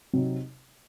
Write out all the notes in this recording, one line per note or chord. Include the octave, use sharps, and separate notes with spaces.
C3 F#3 C4 D#4